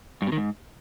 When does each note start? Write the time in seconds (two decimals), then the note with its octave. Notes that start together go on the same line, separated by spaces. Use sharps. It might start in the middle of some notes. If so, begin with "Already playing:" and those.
0.22 G2
0.27 B2
0.32 D#3
0.37 G#2